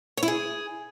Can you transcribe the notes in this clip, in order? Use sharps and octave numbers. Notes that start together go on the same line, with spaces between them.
C#5
E4
G#4